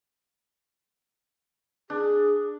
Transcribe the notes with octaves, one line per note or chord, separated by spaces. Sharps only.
D4 G#4